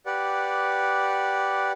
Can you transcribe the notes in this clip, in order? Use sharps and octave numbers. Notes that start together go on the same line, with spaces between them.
G4 B4 D5 F#5